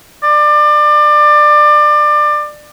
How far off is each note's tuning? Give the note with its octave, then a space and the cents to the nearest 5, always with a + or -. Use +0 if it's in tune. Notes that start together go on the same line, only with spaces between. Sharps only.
D5 +25